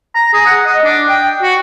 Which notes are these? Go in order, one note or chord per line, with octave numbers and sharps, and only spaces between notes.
A#5
G#4
F#5
D#5
D4
G5
F#4